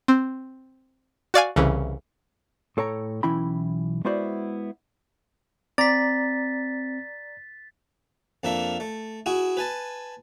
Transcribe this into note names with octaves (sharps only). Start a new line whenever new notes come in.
C4
F#4 D5 F5 G#5
C2 C#3 E3
A2 A4 C#5 G5 A#5
B1 E3 C#4 E4 G5 B5
G#3 B3 E4 F#4 C5 D5
C4 D5 A#5 A6 B6
F2 A#3 D4 E5
A3
E4 F#4 G#4
B4 G#5 A5